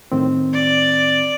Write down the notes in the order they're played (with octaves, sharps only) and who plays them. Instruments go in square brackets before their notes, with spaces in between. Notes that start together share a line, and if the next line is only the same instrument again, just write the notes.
[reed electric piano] A2 D#3 C4
[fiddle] D5